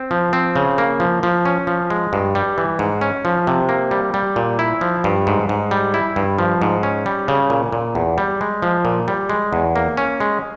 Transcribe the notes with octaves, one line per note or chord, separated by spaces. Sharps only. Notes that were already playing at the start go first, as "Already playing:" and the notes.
Already playing: C4
F3
C4
C#3
A#3
F3
F3
C#4
F3
G#3
G2
G3
E3
G#2
C#4
F3
C3
A#3
G3
G3
A#2
E4
F3
G2
G#2
G#2
G3
E4
G2
F3
G#2
C#4
G3
C#3
A#2
A#2
E2
G3
G#3
F3
A#2
G3
G#3
E2
A#3
C#4
G#3